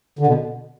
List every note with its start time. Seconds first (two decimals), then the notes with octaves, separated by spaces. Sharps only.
0.19 D3
0.27 B2